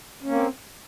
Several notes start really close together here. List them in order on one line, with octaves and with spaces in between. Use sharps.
C#4 A#3 C4